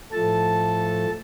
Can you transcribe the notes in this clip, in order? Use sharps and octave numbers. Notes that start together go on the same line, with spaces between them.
A2 F3 A3 A4 A5